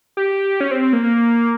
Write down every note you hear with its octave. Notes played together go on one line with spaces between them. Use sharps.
G4
C#4
C4
C4
A#3
A#3